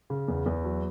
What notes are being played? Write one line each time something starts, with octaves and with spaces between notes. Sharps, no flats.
C#3
E2
E2
F#3